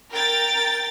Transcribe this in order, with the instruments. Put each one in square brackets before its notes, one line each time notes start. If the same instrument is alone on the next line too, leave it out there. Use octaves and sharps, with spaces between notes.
[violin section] A#4 G5 A6